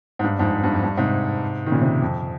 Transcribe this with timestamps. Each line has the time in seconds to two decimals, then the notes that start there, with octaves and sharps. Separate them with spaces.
0.19 G#2
0.24 G2
0.39 F2 G#2
0.63 G2
0.73 F2
0.83 G2
0.97 G#2 C3
1.66 D#3
1.72 A#2 C#3
1.81 C3 D#3
2.02 F2